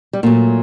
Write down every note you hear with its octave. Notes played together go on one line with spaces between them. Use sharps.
G3
A#2 F#3 A3